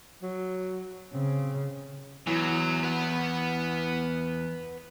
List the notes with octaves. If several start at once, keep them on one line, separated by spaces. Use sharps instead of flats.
F#3
C#3 C4
E2 E3 F#3
B4 F#5